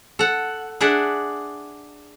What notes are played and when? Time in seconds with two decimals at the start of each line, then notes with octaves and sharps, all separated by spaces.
0.19 A4 F#5
0.81 D4 G#4 D5 E5 F#5